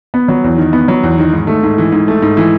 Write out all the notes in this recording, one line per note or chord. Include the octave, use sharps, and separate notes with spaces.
B3
F#3
E2
D#3
B3
F#3
E2
D#3
G#2
A3
G#2
E3
G#2
A3
G#2
E3